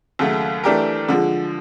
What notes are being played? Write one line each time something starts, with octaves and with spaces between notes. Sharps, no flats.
D#2 C#3 F#3 A3
E3 A3 D4 G4 A#4
D3 F3 G#3